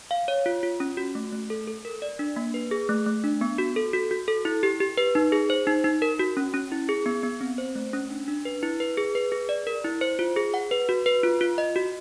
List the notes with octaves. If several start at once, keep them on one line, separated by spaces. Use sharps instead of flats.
F5
C#5
F4
F4
C#4
F#4
A3
A3
A4
A4
A#4
D5
D4
A#3
B4
G#4
A3
A3
D4
B3
F#4
A4
F#4
F#4
A4
E4
G4
G4
B4
D#4
G#4
C5
D#4
D#4
A#4
F#4
C#4
C#4
E4
G#4
B3
B3
C4
C5
A3
C#4
D4
D4
B4
E4
B4
G#4
B4
G#4
D5
A#4
E4
C5
F4
G#4
F#5
B4
F#4
B4
F4
F4
D#5
F#4